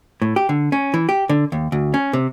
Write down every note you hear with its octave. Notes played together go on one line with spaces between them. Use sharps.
A2
G4
D3
C#4
E3
G4
D3
D#2
D2
C#4
C3